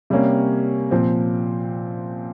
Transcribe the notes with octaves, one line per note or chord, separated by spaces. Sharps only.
C3 G3 A#3 C#4
A#2 F3 C4